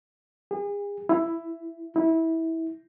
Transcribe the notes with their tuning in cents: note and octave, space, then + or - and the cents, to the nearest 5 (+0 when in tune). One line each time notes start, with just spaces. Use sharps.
G#4 -40
E4 +10
E4 -20